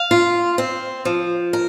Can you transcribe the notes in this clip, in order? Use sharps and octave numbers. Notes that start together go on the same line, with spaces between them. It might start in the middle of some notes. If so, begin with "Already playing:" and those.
Already playing: F5
F4
C4
F3
A#4